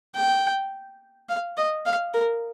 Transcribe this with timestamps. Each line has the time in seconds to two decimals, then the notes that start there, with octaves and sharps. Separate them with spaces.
0.15 G5
1.29 F5
1.57 D#5
1.85 F5
2.14 A#4